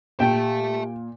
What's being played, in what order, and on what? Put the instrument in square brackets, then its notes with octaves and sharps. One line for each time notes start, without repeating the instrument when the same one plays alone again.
[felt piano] A#2 [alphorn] G4 [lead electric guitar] E5 A5 [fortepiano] G5